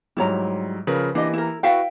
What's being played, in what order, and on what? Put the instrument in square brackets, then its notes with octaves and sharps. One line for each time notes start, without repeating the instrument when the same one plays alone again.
[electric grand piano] G#2 F#3 G3 [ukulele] E4 C#5 A#5
[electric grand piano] C#3 F3 A#4 [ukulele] B4
[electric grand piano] E3 A#3 G4 [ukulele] D4 D#5
[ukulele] E4 A#4
[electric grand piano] E4 F#4 B4 [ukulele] E5 F5 G5